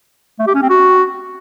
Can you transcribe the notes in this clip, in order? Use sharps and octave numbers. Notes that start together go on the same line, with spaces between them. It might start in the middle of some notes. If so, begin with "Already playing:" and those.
A3
G4
C#4
C4
F#4